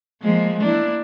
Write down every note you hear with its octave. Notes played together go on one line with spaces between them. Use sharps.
F3 G#3 A#3
A#3 D4 E4